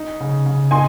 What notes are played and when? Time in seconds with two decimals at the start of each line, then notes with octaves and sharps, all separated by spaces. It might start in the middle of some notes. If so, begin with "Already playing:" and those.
Already playing: D#4
0.20 C#3
0.46 C#3
0.71 D#4 G#5 C6